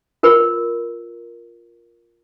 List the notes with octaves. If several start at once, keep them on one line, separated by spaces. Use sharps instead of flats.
F4 A#4 B4 B5